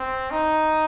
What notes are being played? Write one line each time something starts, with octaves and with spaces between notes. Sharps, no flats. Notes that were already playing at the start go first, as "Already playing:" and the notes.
Already playing: C4
D#4